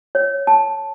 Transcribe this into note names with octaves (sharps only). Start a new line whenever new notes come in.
C#5
A5